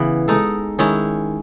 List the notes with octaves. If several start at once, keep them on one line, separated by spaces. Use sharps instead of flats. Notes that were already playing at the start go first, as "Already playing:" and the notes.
Already playing: C#3 E3 B3
G#3 D#4 A4
D#3 G#3 C#4 E4